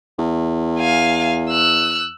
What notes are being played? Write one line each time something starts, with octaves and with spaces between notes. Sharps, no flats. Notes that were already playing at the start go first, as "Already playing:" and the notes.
E2
F5 G#5
E6 F#6